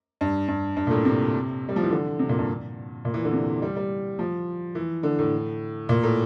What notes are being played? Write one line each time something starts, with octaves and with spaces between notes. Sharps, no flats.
G2
G2
G2
A#2
A2
C3
G3
F3
E3
D3
C3
A#2
G2
A#2
E3
D3
C3
G3
G3
F3
E3
D3
A2
A#2
A2